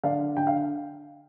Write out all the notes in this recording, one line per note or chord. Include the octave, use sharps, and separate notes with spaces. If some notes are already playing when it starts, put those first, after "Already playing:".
D3 D5 F5
D3 G5
F5